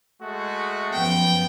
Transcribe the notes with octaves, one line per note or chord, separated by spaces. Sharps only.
G#3 A3 F#4
F#2 F3 B3 G5